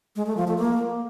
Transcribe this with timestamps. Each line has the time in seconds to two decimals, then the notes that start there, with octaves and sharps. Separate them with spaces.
0.16 G#3
0.26 A3
0.37 F3
0.47 A3
0.58 A#3